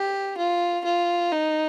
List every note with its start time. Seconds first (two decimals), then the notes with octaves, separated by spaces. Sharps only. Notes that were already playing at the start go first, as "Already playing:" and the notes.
Already playing: G4
0.38 F4
0.85 F4
1.32 D#4